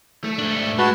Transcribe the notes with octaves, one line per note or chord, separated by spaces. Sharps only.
A3
G#2 D4
G#3 F#4 B4 A5